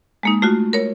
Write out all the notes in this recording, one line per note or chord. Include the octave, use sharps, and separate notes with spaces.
G#3 A#3 D#4
A3 F4 F#4
A#4 C#5